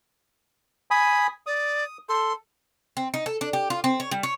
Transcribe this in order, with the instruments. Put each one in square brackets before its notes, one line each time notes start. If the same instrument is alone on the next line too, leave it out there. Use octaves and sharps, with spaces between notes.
[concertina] G#5 B5 D#6
[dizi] D5 [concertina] D#6
[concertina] A4 [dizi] C6
[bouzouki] C4
D#4
A4
D4
G4
F4
C4
C#5
G3
C#5